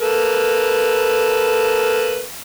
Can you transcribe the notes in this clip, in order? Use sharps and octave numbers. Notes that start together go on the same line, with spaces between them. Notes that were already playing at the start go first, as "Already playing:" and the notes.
A#3 A4 B4